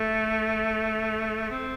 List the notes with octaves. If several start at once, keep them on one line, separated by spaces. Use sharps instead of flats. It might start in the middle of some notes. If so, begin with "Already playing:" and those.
Already playing: A3
C4